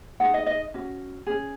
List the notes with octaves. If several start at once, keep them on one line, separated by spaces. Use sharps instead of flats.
D#4 G#4 F#5
D#5
D#5
C#4 F#4
C#4 G#4